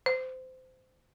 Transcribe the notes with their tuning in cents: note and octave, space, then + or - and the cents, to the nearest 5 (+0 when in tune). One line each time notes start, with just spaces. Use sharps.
C5 -20